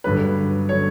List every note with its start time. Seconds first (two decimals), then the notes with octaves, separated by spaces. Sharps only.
0.04 G2 D3 F#3 B4
0.69 D3 F#3 C#5